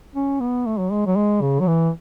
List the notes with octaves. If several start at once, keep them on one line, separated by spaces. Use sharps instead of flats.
C#4
B3
A3
F#3
G#3
F#3
G#3
C#3
F#3
E3